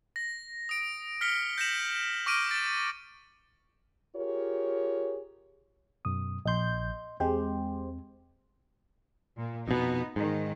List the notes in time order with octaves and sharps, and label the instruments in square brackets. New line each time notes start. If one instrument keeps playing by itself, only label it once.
[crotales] A#6
D#6 D7
F6 B6 C#7 G7
G6 A#6 B6 C#7 E7 F#7
C#6 D6 F6 A#6 D7 D#7
A6 D7
[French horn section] F4 G4 G#4 A#4 C#5
[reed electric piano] F#2 B2 D#6
[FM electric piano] A#1 G6 [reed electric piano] D#5 C6
[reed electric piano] E2 C4 [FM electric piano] G#3 G4 C5
[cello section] A#2
[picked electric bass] F2 B2 [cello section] B3 D#4
[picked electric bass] G#2 [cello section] D#3